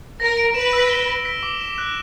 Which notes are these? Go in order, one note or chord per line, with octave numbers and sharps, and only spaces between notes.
A#4 A#6
D7
B4 E7
E6
G7
A#6
B6
D6
E7
F#6